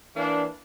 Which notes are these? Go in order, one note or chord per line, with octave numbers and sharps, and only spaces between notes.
E3 A#3 D4